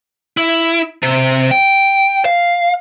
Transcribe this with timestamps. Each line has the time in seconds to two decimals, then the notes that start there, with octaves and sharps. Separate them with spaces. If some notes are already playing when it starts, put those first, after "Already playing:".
0.37 E4
1.03 C3
1.51 G5
2.25 F5